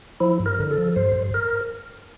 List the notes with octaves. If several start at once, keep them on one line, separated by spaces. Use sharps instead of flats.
F3 E4
G2
A#4
D3
A4
F3
G2 C5
G2
A#4